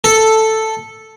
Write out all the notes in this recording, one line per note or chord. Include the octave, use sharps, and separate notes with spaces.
A4